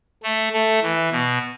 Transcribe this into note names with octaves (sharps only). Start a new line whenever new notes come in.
A3
A3
E3
B2